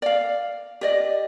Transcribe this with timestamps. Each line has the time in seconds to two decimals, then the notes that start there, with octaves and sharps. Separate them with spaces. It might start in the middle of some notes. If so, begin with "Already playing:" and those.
0.02 D5 F5
0.81 G4 D5 D#5